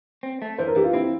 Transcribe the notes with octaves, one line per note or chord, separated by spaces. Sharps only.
C4
A3
E3 C5
A#4
E3 G4
F4
C4 E4